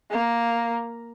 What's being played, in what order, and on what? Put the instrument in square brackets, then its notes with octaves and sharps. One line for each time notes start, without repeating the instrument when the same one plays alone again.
[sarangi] A#3